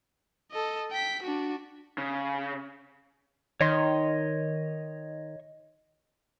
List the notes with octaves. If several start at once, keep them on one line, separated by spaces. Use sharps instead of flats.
A4 D#5
G5 B6
D4 F#4
C#3
D#3 C#5 D#5 C6